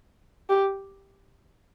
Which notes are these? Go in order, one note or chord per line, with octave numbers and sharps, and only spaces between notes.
G4